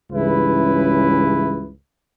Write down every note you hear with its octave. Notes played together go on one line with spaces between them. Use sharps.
C#2 G2 C#3 E3 E4 B4